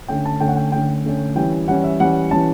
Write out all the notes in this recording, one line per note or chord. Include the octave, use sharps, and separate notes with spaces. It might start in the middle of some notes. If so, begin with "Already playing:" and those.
D3 A3 C#4 G5
A5
D3 A3 C#4 G5
F#5
G5
D3 A3 C#4 G5
D3 A3 C#4
E3 G3 C#4 G5
E3 G3 C#4 F#5
E5
E3 G3 C#4 F#5
E3 G3 C#4 A5